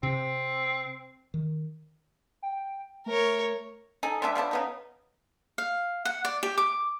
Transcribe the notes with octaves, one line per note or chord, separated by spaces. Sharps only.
C3 C4
D#3
G5
A3 A#4 C#5
D#4 G#4 A4
G#3 B3 D4 E5
F3 B3 D4 E4
C#3 B3 D#4
F5
F#5
D5
G4
D6